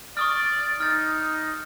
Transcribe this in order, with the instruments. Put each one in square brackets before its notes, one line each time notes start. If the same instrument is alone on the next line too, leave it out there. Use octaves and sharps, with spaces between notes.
[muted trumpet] D5 [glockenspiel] C#6 D#6 F6
[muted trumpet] D#4 [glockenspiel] F6 A6